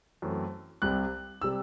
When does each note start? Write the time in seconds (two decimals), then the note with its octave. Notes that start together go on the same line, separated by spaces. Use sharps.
0.22 F#2 E3 A3 C4
0.82 C2 C3 G3 C4 F#6
1.42 C3 G3 C4 E6